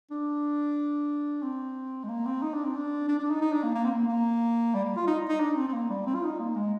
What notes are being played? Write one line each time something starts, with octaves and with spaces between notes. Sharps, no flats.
D4
C4
G#3
A#3
C4
D#4
D4
C4
D4
D4
D4
D#4
D#4
D4
A#3
A#3
C4
A#3
A#3
G3
G3
F4
D#4
D#4
D4
C4
C4
A#3
G3
C4
F4
D#4
A#3
G#3